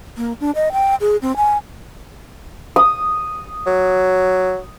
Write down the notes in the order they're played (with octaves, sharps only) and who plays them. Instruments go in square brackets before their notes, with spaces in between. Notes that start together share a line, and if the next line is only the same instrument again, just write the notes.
[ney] A#3
D4
D#5
G5
G#4
C4
G#5
[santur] D#6
[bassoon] F#3